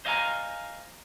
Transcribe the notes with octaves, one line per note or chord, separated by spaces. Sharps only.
C5 D#5 F5 F#5 G#5 A#5